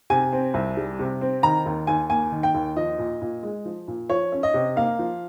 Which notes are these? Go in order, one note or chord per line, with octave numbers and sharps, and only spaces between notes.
C3 G#5
C4
C2
G3
C3
C4
D#3 A#5
D#2
D#2 G#5
A#3 G#5
D#3
G5
D#2
F3 D#5
A#2
A#2
G#3
F3
A#2
F3 C#5
C#4
D#5
C3
A#3 F5
F3